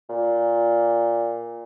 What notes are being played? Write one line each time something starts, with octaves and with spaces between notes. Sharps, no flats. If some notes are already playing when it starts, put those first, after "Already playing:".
A#2